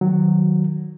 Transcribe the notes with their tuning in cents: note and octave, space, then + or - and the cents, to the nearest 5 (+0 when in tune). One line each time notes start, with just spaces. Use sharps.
D#3 -5 F#3 +0